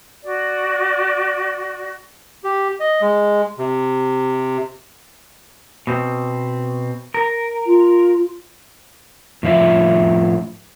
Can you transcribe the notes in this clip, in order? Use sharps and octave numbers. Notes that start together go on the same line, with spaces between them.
F#4 D5
G4
D#5
G#3
C3
B2 C4
A#4
F4
A2 F3 F4 E5